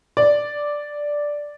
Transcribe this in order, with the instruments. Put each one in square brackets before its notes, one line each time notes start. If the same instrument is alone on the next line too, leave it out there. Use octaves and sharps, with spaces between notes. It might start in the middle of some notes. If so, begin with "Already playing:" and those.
[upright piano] D5